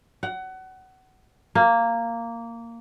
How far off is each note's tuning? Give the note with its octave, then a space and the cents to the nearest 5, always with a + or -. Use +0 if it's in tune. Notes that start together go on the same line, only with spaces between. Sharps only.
F#5 +25
A#3 -10